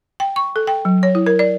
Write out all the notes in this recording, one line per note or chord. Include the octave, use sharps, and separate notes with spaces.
G5
C#6
A4
G5
F#3
C#5
E4
A#4
D5